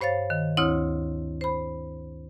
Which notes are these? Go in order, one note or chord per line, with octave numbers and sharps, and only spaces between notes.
G2 C5 C#5 F5 A6
D#3
D2 C4 E4 C#5 D#6 F6
C5 B5